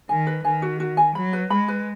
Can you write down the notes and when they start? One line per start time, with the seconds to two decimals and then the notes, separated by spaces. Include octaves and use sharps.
0.09 D#3 G#5
0.27 B4
0.44 D#3 G#5
0.62 F#4
0.80 F#4
0.97 G#5
1.15 F#3 B5
1.33 B4
1.50 G#3 B5
1.68 B4